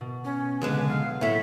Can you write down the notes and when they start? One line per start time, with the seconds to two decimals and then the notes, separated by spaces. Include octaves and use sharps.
0.01 B2
0.24 C#4
0.62 C#2 D3 G#3 B4
0.88 F#3 F5
1.21 A2 A3 E5